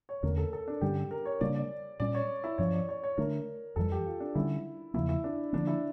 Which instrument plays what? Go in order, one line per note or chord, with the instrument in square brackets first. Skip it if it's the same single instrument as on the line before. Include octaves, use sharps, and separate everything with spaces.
[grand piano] C#5
[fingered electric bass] E2 D3 A3 C#4 [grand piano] A#4
[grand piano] A4
A4
D4
[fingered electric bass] G2 D3 G3 C#4 [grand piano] G4
[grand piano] A#4
C#5
[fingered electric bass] C#3 G3 A#3 D4 [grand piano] D5
[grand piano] D5
[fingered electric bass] A#2 G3 C#4 [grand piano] D5
[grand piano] C#5
E4
[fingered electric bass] G2 F3 C#4 [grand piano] C#5
[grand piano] D5
C#5
C#5
[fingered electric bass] D3 A3 D4 [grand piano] A#4
[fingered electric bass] F2 E3 G3 [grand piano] A4
[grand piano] G4
F4
D4
[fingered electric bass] D3 G3 C#4 [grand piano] E4
[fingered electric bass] E2 C#3 F3 A#3 [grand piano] E4
[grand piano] E4
D4
[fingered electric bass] D3 F3 A#3 [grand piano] D4
[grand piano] E4